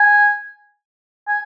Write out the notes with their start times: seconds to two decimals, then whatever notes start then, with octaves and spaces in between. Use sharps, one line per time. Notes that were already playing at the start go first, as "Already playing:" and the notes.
Already playing: G#5
1.27 G#5